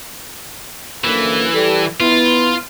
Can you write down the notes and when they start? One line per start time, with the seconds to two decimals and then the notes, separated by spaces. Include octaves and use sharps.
1.04 F#2 D3 E3 A#3
1.52 G3 G4 A4
2.00 B3 E4 F4